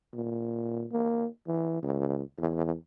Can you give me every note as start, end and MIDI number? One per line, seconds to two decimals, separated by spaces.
0.14 0.86 46
0.92 1.27 58
1.47 1.80 52
1.82 2.23 37
2.38 2.73 40